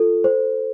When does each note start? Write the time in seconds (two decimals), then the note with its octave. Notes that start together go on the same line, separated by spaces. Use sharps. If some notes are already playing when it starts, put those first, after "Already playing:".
Already playing: F4 A4
0.24 C5